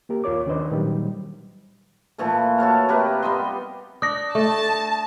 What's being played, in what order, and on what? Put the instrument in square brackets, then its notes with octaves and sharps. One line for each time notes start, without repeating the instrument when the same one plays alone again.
[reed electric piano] A#3 G4 A#4
D#2 F4 A#4 C#5 D6
D#3 C#4 D4 B4 C5 D#5
A#2 D#3 F#3 G3
[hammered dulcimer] A#2 E3 F3 A3
F#4 A4 C#5 F5
C3 G4 A#4 B4
G3 B3 D#5 C6
[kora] D4 [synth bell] D#6 A#6
[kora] A3 [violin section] A5